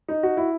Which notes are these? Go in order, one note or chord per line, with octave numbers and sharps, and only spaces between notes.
D#4
F#4
E4